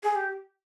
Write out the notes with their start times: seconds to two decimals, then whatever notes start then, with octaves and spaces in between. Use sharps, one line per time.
0.03 G#4
0.15 G4